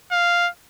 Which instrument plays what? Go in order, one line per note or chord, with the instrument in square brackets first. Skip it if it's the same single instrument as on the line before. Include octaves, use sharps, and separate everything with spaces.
[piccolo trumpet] F5